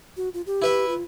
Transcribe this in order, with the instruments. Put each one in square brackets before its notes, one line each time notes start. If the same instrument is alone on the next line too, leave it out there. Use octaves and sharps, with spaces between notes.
[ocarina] F#4
F4
G4
[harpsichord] E4 B4 E5
[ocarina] F4